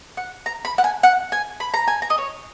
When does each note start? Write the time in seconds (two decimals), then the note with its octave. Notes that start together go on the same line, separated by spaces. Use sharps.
0.17 F#5
0.46 A#5
0.65 B5
0.78 F#5
0.84 G#5
1.03 F#5
1.32 G#5
1.60 B5
1.74 A#5
1.88 G#5
2.02 A#5
2.10 D#5
2.18 C#5